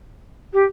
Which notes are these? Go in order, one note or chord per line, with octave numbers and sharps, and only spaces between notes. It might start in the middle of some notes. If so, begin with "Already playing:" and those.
G4